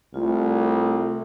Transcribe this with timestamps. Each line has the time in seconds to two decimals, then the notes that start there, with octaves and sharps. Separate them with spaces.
0.14 C2 A3 F4